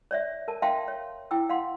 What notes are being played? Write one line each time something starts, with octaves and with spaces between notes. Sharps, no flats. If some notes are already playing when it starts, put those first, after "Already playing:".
C#5 D5 E5
A#4 A5
E5 F5 G5 A5 C6
C#5
E4 G5 D6 E6
F5 F#5 C6